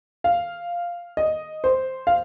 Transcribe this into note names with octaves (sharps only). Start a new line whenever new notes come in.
F5
D#5
C5
F5